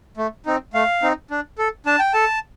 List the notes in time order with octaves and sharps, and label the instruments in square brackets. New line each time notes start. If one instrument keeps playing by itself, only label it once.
[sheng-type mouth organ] A3
C4 D#4
A3 F5
C4 D#4
D4
A4
D4 A5
G5
A4 A5